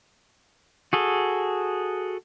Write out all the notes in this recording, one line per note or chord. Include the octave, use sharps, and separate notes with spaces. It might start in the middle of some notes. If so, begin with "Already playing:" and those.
F#4 G#4 A4